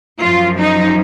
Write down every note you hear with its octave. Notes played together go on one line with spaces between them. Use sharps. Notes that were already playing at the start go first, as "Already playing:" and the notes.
F#2 F3 F4
D#4